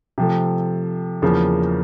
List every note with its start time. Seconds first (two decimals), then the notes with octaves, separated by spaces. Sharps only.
0.18 C3 F3 A3
1.22 E2 C#3 F3 A#3 C#4